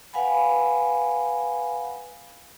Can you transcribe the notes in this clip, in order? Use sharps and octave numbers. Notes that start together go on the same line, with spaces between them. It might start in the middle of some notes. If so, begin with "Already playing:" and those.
B4 F5 F#5 G#5 B5